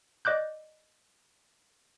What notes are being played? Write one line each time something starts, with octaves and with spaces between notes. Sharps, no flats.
D5 D#5 D6 F#6 G6